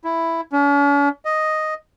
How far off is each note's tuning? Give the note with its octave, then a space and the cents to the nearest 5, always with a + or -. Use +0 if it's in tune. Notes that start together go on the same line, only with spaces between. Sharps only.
E4 +5
C#4 +45
D#5 +0